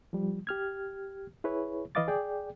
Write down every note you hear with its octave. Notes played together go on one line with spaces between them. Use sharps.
F3 G3
G4 F6 G#6
E4 G#4 B4 C#5
E3 B4 D#5 F5 D6 A6
G#4 D5 G5